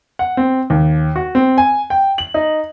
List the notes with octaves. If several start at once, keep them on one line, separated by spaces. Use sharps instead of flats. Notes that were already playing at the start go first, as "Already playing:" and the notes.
F#5
C4
D#2
F#4
C4
G#5
G5
F#7
D#4